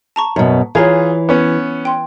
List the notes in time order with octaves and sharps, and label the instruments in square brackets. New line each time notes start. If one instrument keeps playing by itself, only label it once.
[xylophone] A5 A#5 C#6
[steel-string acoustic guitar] F#2 B2
[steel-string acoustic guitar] E3 [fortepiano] F4 G#4 [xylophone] C#5 A#5 G#6
[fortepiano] B3 C#4
[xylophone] G5 C6